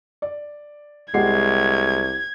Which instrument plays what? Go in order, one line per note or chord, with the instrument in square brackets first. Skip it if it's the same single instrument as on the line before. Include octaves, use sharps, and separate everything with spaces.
[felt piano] D5
[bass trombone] C2 [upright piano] G#3 [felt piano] G4 F#5 C7 [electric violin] G#6